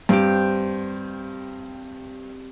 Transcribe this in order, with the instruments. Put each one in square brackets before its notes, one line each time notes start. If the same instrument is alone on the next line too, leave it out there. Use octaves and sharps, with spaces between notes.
[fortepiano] G2 [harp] C4 G4